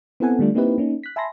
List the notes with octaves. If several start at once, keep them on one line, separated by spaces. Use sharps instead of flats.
B3 C4 E4 A4 F#5 G#5
D3 G3 A3 D4 F4
A#3 C4 D#4 E4 G4 B4
A#3 C#4 D#4
F#6 B6
E5 G#5 A5 B5 C6 A#6